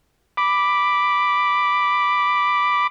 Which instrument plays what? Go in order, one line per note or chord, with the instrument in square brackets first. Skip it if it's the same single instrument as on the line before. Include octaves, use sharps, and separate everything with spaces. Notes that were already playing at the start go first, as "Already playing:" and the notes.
[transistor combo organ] B5 D6